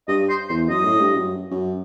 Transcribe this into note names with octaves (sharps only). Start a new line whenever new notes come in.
G2 D#5
C5
E2 C5
F#2 D#5
A2
G2
F#2
F#2